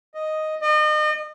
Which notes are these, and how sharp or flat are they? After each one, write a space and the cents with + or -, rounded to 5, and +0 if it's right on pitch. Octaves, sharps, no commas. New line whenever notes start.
D#5 +0
D#5 -35